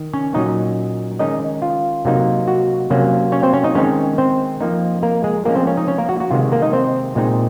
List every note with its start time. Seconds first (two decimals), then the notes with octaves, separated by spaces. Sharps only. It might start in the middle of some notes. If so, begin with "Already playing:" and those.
Already playing: D#3
0.13 C#4 C#5
0.34 A#2 F#3 C#4 D#4 D#5
1.19 D#3 G#3 C#4 D#4 D#5
1.62 F4
2.05 C3 F#3 A#3 D#4
2.48 F#4
2.90 C3 F#3 A#3 C#4
3.32 C#4 C#5
3.43 C4 C5
3.53 C#4 C#5
3.64 D#4 D#5
3.75 D#3 G#3 C4 C#4 D#4 C#5
4.18 C4 C5
4.60 F3 A#3 D#4
5.03 A#3 A#4
5.24 G#3 G#4
5.45 F3 G#3 A#3 C#4 A#4
5.55 C4 C5
5.67 C#4 C#5
5.77 D#4 D#5
5.88 C#4 C#5
5.98 A#3 A#4
6.09 F#4
6.20 F#4
6.31 C3 D#3 G#3 F4
6.52 A#3 A#4
6.62 D#4 D#5
6.73 C4 C5
7.15 A#2 G#3 C4 D#4